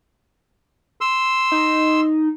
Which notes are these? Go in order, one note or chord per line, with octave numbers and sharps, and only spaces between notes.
C6 E6
D#4